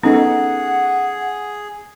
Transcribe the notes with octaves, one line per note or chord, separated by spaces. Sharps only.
B3 C#4 D#4 G#4 A4 F#5